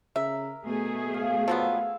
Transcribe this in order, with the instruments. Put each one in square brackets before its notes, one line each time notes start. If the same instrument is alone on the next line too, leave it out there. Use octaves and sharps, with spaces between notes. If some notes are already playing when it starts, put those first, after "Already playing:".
[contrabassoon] C#3 [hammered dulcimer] A#4 [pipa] E5
[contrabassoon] B2 [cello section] A3 G#4
[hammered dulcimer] F5
[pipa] F3 F#3 B3 [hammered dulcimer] E5 F5